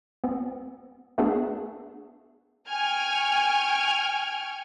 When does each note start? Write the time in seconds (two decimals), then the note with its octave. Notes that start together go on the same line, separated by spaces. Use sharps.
0.24 B3 C4
1.18 A3 B3 D4 F#4 G#4 A4
2.70 G5 G#5 C#6 F6 G#6